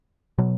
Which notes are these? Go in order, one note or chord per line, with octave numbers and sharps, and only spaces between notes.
B2 F#3